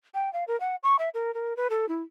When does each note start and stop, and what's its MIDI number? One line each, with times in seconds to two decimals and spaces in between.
0.14 0.32 79
0.33 0.44 77
0.48 0.59 70
0.60 0.76 78
0.83 0.96 85
0.99 1.09 76
1.14 1.33 70
1.34 1.56 70
1.57 1.67 71
1.70 1.88 69
1.89 2.03 64